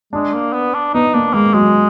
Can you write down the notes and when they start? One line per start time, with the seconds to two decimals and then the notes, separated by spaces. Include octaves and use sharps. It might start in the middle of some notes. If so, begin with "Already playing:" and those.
0.13 G#3 D4
0.34 A#3
0.53 B3
0.74 D4
0.94 B3 D#4
1.14 A#3 D4
1.34 G#3 A#3
1.54 F#3 G#3